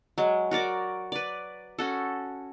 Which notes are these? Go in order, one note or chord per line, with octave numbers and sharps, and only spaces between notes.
F#3 G#3
F#4 A#4 D5 D6
B4 D5
C#4 F#4 A4